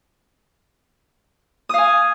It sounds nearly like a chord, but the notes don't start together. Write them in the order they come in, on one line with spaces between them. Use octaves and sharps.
D#6 F5 G#5